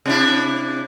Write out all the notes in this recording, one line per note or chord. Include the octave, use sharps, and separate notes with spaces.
C3 D4 E4